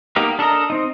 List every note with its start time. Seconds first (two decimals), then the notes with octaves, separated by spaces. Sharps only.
0.16 A#3 B3 D#4 G4 A#4
0.39 D4 A4 A#4 D#5 A#5
0.70 C4 D#4